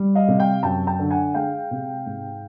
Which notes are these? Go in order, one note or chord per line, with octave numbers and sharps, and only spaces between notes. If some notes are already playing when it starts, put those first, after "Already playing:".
Already playing: G3
D#5 F5
C3
F5 G5
F#2 G5 A5
G5 A5
D3
F#5 G#5
G#3 F5 G5
C3
G#2